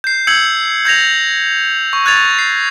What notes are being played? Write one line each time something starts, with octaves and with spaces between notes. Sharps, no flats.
G6 C7
E6 G6 G#6 C#7 F#7
G6 G#6 A#6 F7
C#6
F#6 G#6 A6 F7
C7